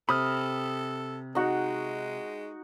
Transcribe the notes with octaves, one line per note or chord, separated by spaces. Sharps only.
C3 A4 B5 D#6 F6
G#3 D#4 F#4